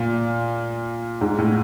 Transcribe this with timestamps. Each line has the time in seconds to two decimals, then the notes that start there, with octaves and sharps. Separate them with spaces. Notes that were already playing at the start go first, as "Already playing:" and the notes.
Already playing: A#2
1.21 G#2
1.38 A2